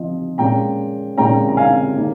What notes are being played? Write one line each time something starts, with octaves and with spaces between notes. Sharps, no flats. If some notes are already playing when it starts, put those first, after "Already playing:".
Already playing: F3 C4 D#5
A#2 G#3 C#4 G5 A#5
A#2 G#3 C#4 G5 A#5
A#5
F5 G#5
D#3 A#3 C#4